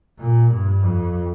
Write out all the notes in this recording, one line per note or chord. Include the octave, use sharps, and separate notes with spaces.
A#2
G2
F2